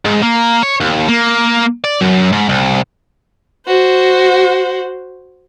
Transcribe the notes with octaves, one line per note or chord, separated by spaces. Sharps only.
G#2
A#3
C#5
D#2
A#3
D5
F#2
G#2
C2
F#4 C5